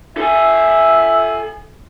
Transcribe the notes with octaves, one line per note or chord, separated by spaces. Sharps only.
A4 E5 G#5